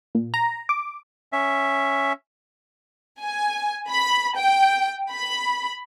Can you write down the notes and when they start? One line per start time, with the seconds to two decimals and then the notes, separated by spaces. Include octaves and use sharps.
0.15 A#2
0.34 A#5
0.69 D6
1.33 C#4 E5
3.21 G#5
3.90 B5
4.37 G5
5.11 B5